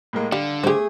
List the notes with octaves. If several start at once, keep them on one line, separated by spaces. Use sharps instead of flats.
A2 G#3 A#3
D3 G3 F5
A3 G4 G#4 C5